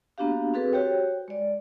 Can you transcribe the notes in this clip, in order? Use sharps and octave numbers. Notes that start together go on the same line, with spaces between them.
A#3 B3 D4 F#4 G4 F5
C4 F#4 G#4 A4 B4
F#4 G4 C5 C#5 G5
G#3 D5